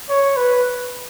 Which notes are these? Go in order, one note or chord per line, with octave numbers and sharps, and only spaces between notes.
C#5
B4